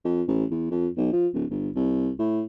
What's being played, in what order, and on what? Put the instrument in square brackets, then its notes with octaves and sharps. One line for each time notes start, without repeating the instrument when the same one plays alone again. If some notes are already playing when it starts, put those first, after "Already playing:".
[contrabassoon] F2
A1
E2
F2
B1
F3
D1
G1
C2
A2